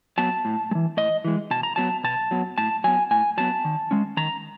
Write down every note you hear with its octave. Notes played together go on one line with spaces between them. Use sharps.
F#3 B3 A5
A2
G#3
E3
A2 D#5
E3 G#3
B2 A5
A#5
F#3 B3 A5
B2 A5
F#3 B3
A2 A5
F#3 B3 G#5
A2 G#5
F#3 B3 A5
D#3
G#3 C#4
D#3 A#5